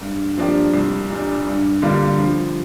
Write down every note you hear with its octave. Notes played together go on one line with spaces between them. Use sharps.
G2
F3 A#3 D4 G4
C2
A#2 G3 D4
G2
D3 G3 A#3 F4
F3